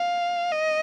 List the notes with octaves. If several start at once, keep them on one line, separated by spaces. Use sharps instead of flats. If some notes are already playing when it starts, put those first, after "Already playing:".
Already playing: F5
D#5